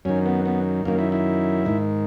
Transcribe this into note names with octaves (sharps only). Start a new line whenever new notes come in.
F#2 D#3 C#4
B3
B3
F#2 D#3 A#3
E4
E4
G#2 D#3